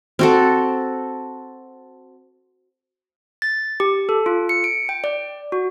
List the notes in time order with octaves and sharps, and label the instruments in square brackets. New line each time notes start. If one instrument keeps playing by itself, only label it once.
[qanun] C4 F#4 A4
[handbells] A6
G4
A4
F4
C#7
D7
G5
D5
F#4